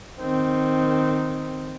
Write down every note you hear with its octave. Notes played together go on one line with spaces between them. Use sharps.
D#3 C4